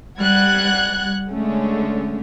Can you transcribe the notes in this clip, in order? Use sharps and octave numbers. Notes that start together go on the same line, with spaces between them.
G3 F#5 F#6 G#6
D3 G#3 A3 C#4